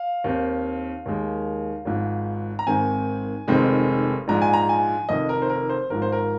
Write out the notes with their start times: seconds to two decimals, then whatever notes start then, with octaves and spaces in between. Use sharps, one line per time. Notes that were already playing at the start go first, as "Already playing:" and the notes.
Already playing: F5
0.24 D#2 D#3 C4
1.06 D#2 D#3 G#3
1.85 G#1 G#2 F3
2.59 A#5
2.67 G#1 G#2 D#3 C4 G#5
3.48 F1 F2 D#3 G#3 C4
4.28 A#1 G#2 F3 G#3 A#5
4.42 G#5
4.54 A#5
4.69 G#5
5.09 F1 F2 D#3 D#5
5.29 A#4
5.42 C5
5.50 A#4
5.70 C5
5.90 G#1 G#2 F3 A#4
6.02 C5
6.12 A#4